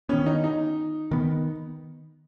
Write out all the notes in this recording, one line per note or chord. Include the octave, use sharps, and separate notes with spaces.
D#3 B3 C#4
D#4
D#4
D#3 B3